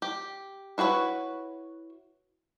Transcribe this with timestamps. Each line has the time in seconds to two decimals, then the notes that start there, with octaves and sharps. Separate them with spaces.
0.02 G4
0.78 E4 F#4 G#4 B4 C#5